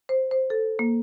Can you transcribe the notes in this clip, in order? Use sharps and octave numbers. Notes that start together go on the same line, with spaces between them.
C5
C5
A4
A#3